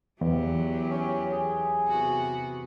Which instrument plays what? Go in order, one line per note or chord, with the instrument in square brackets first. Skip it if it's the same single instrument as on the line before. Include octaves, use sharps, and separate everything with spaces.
[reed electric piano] E2 [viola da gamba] E3 F#3 G4
[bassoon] C#4
G#4
[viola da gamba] C3 B3 F#4